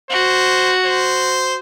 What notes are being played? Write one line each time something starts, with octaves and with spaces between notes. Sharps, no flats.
F#4 C5
C5